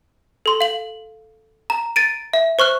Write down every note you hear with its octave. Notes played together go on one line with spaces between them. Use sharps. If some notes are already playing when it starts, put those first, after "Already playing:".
A4 C6
F5 F#7
A#5
A6 D7 D#7
E5
C5 C#6 F6 F#6